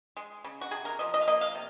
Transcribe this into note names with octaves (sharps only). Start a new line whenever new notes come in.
G#3
C#3
F#4
C3 G#4
A#4
F3 D#5
D#5
F5
A#3 D#5
F5
C3